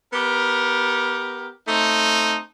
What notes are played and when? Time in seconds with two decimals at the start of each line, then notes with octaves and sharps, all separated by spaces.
0.13 B3 G4 A#4
1.68 A3 C4 D#4